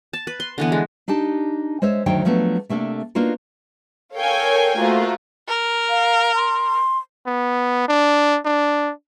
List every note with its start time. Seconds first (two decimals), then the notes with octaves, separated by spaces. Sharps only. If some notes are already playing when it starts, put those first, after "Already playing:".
0.13 A5
0.27 B4
0.40 C6
0.58 D3 E3 B3
0.72 G#3
1.08 D4 D#4 G4 A5
1.82 G#3 C5 C#5 E5
2.06 D2 D#3 F#3 C5 G5
2.25 F3 F#3 A3 B3 C#4 D4
2.69 C3 A3 A#3 D4 A4
3.15 A#3 B3 D4 D#4 F4 F#4
4.16 A4 A#4 C#5 F5 G5 G#5
4.79 A3 A#3 F4 F#4 C5
5.48 A#4
5.89 F5
6.35 C6
7.27 B3
7.89 D4
8.45 D4